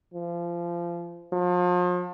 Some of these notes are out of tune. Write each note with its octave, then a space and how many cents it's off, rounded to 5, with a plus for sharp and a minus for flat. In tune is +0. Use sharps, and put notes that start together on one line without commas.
F3 -25
F3 +40